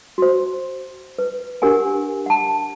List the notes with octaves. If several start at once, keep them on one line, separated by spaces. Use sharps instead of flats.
F#4 C5
B4
D4 G4 A#4 F#5 G#5
F#5 A5